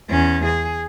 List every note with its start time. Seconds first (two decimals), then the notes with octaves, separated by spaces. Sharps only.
0.10 E2 C#4
0.45 G#4